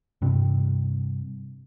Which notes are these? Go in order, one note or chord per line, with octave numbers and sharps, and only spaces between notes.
G2 C3